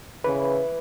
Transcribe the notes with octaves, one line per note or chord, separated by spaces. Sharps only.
C#3 E3 B4